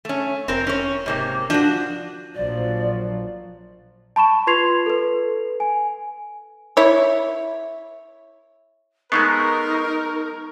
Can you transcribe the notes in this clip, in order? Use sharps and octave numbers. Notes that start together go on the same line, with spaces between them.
A3 C#4
F1 C4 A#4
C#4 C#5
G#2 C3 A#3
F3 D4 F#4
A#1 F3 F#3 D5
A5 B5 C#6 E7
F4 B4 C6 G#6 C7 F7
A4 B4
G#5
E4 C#5
G#3 A3 B3 D#4 A#4 C#6 C7